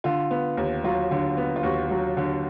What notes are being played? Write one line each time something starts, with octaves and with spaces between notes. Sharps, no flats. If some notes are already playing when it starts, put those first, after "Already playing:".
D3 F4
B3
D#2
F#3 F4
D3
B3
F4
D#2 F#4
F#3
D3